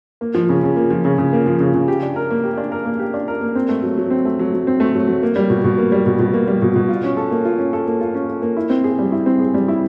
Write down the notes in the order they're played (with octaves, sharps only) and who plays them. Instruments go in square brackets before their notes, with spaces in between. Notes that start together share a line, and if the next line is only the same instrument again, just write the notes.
[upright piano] A#3
F3
C#3
C#3
A#3
F3
C#3
C#3
A#3
F3
C#3
C#3
G4
D4
A#4
A#3
G4
D4
A#4
A#3
G4
D4
A#4
A#3
C4
A3
F#3
F#3
C4
A3
F#3
F#3
C4
A3
F#3
F#3
A#3
G3
B2
B2
A#3
G3
B2
B2
A#3
G3
B2
B2
F4
C#4
A4
A#3
F4
C#4
A4
A#3
F4
C#4
A4
A#3
E4
C4
G#4
G3
E4
C4
G#4
G3
E4